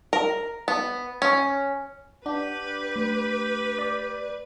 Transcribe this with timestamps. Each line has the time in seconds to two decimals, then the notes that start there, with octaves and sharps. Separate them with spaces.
0.13 A#4
0.68 B3
1.22 C#4
2.26 D4 G4 B4 F#5 D6
2.96 A3
3.78 D5